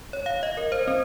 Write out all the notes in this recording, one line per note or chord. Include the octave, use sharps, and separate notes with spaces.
C#5
F5
D#5
A#4
C5
C4